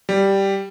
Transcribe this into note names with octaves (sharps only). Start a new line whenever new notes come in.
G3